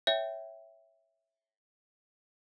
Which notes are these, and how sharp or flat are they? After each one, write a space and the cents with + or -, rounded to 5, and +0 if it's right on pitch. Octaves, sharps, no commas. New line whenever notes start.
C#5 +0 E5 +0 G5 +0